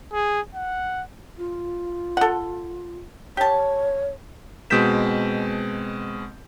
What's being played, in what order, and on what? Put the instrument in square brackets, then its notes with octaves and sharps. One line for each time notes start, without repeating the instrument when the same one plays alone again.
[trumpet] G#4
F#5
[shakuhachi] F4
[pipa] A4 F#5
[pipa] G4 A5 [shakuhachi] C#5
[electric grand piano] B2 G#3 C4 G6 B6 E7